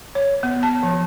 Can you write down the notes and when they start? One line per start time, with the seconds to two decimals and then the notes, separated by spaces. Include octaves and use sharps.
0.15 C#5
0.43 B3
0.63 A5
0.83 F3